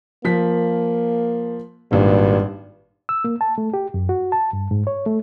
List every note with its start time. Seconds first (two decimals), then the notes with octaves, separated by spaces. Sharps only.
0.25 F3 A#3 B6
1.92 G#1 G2 A#2
3.09 E6
3.24 A#3
3.41 A5
3.58 A3
3.74 G4
3.94 F#2
4.09 F#4
4.32 A5
4.53 G2
4.71 G#2
4.87 C#5
5.06 A3